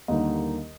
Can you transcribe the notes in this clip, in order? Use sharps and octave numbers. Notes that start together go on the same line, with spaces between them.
D#2 D3 G3 A#3 D#4 D#5